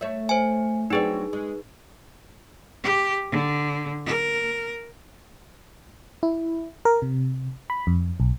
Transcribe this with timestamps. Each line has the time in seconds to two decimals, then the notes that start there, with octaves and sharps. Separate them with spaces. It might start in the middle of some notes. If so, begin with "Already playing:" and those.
0.01 A3 C#5 E5
0.29 C5 G#5
0.90 F#3 C4 D4 D#4 G#4 B4
1.33 G#3
2.83 G4
3.31 D3
4.06 A#4
6.23 E4
6.85 A#4
7.02 C3
7.70 B5
7.87 F2
8.20 B1